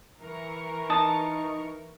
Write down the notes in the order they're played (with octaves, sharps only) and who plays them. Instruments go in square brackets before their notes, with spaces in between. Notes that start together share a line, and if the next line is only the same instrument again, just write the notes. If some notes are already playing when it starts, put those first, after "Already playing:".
[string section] E3 A#4 C#6
[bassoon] D#4 [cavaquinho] A5 D#6